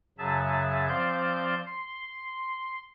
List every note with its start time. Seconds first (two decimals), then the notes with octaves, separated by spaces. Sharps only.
0.18 F#2 C#3 F#3 G#4 E5 A5
0.88 F3 C4 C5 D5 F5 G6
1.66 C6